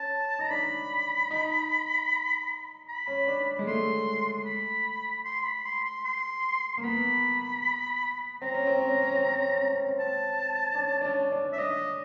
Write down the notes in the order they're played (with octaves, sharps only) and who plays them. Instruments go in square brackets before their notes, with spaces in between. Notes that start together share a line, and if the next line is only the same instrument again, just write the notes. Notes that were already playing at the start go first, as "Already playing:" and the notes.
Already playing: [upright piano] C#4 [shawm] A5
[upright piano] D#4 [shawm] A#5
[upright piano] D4 [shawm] B5
[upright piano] D#4
[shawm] B5
[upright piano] C#4
D4
G#3
[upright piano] A3 [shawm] C6
[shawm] B5
C6
B5
C6
C6
C6
[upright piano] A#3
[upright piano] B3 [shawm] B5
[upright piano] C4 [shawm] A#5
[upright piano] C#4
C4
C#4
C4
C#4
C4
C#4
C4
C#4
C4
C#4
C4
[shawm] A5
[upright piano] D4
C#4
D4
C#4
D4
[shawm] E5
[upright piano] D4 [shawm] D#5